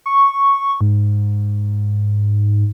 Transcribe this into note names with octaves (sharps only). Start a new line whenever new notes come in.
C#6
G#2